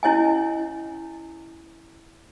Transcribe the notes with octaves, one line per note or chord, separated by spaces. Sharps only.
C#4 E4 C#5 D#5 G#5